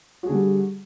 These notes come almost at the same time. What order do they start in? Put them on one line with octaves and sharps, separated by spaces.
F#4 G#4 D3 G3